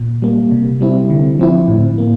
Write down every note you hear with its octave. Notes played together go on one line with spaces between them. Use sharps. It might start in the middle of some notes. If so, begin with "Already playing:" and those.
Already playing: A#2
G3 A#3
C3
G3 C4 E4
D3
F3 C4 E4
A2
A#3